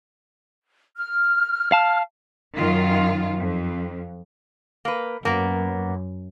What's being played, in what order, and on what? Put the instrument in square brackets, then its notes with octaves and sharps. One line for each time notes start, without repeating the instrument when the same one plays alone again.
[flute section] F6
[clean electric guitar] F5 A5
[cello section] F#2 D#3 F4
F2
[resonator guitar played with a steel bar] A#3 B4
[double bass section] F#2 [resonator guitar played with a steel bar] A#3 B3